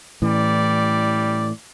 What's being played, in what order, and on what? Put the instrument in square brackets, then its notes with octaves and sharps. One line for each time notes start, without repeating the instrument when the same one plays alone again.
[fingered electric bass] A2 E3 [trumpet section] G3 D5